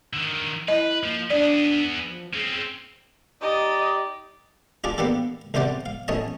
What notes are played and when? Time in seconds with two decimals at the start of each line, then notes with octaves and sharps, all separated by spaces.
0.13 D3 D#3
0.68 E4 B4 D#5
1.03 F3 A#3
1.30 B3 D4 G#4 D5
2.05 F3
2.33 C4 C#4 G#4
3.41 D#4 G4 D5 D#5
4.84 D4 F4 G#4 D5
4.98 A#3 B3 D4 G4 A4
5.54 C2 C3 G3 C5 D5 F#5
5.86 F5
6.08 A1 C#5 D#5 A5